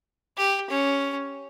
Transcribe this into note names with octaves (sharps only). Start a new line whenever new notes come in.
G4
C#4